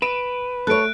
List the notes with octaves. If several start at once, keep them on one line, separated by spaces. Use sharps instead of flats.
B4 D7 E7
A3 A4 C#5 F#6 D7